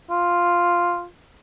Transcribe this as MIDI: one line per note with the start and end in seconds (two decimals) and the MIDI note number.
0.10 1.06 65